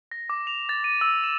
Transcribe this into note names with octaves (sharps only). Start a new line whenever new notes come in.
A#6
D6
F7
A6
D#7
E6
E7